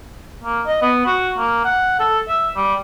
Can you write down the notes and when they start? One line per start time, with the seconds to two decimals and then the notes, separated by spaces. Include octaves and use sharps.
0.43 A#3
0.66 D#5
0.82 B3
1.06 F#4
1.38 A#3
1.65 F#5
2.00 A4
2.28 E5
2.56 G3